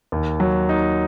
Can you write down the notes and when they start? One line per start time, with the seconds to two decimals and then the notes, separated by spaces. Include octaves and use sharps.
0.12 D#2
0.40 F#3
0.69 D#4